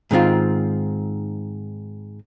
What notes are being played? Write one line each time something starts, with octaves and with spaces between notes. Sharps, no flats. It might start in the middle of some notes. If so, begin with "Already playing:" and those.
G#2 D#3 C4 F4